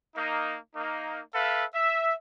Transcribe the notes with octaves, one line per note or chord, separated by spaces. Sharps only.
A#3 D#4
A#3 D#4
A4 B4 E5 F5
E5